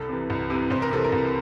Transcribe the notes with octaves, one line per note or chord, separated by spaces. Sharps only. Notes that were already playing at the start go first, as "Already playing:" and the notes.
Already playing: C2 A4
C3 E3
C2
C3 E3
C2 C5
A#4
C3 E3 A4
A#4
C2